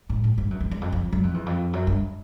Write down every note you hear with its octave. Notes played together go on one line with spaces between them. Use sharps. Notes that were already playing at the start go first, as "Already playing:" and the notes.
A2
G#2
G2
F#2
E2
E2
F2
F2
F#2
F2
E2
F2
F#2
G2